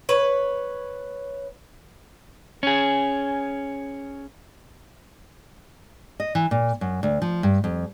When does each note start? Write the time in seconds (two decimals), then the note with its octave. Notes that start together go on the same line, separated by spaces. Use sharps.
0.09 B4 C#5
2.63 C#4 G#4
6.20 D#5
6.35 E3
6.51 A#2
6.81 F#2
7.03 D2
7.22 F3
7.43 G2
7.64 F2